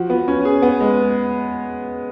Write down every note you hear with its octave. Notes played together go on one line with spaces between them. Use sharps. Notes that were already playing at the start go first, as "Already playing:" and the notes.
Already playing: F3 F#4
B3
C#4
G#4
B3
G#3